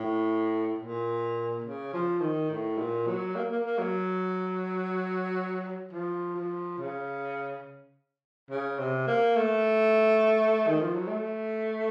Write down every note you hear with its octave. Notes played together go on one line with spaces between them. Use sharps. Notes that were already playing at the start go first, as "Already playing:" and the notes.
Already playing: A2
A#2
C#3
F3
D#3
A2
A#2
F#3
A#3
A#3
A#3
F#3
F3
F3
C#3
C#3
C3
A#3
A3
D#3
F3
F#3
A3